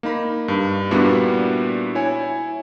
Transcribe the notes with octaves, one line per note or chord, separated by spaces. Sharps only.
A#3 D#4 B5
G2
A#2 G3 B3 D4 E4 F#4
E4 C#5 G#5